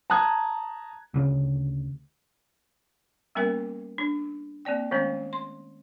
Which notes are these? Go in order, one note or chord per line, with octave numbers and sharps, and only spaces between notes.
A5 A#5 D#6 F#6 G#6
D2 C#3 C#4
G3 A#3 B3 C#4 A#4 E5
D4
A#3 C4 D5 G5
D#3 G#3 A3 B3 C#4
C6